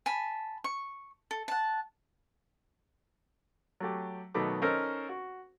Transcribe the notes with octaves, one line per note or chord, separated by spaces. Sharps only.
G#5 A5 B5
C#6
A4
F#5 A5
F#3 A3 G4
B2 D#3 F#3 A3 B3 D6
C#4 D#4 A4 A#4 C5 D#5
F#4